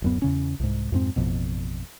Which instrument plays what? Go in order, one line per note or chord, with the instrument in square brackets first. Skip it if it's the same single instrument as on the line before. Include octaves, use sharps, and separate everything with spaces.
[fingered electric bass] D1 F#2 B3
E2 C#3 C#4
C2 G#2
F2 G#2 C4
A1 F2 B2